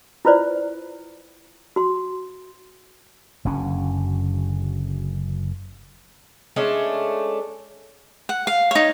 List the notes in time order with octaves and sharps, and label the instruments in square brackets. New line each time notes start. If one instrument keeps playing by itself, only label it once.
[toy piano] E4 F4 B4 C5 D5
F#4 C6
[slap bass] F#1 F#2 D3 C#4
[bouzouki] G#3 A3 C#4 D4
[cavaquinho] F#5
F5
D#4 C#5